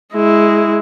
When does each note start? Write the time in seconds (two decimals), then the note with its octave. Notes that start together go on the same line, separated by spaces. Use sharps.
0.15 G#3 E4